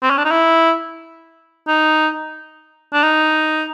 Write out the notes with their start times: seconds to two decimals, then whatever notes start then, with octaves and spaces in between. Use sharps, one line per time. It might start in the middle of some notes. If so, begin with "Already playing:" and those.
0.03 C4
0.10 C#4
0.17 D4
0.25 D#4
0.31 E4
1.68 D#4
2.93 D4
3.03 D#4